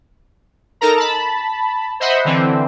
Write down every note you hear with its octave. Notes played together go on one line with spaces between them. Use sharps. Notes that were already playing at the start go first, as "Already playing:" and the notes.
D#4 A4 A#4 A#5
A5 B5
C5 D#5 E5 F#5 B5
D3 E3 C4